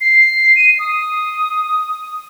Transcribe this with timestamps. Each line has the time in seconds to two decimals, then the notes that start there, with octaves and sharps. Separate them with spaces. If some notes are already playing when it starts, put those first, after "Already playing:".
0.01 C7
0.56 D#7
0.79 D#6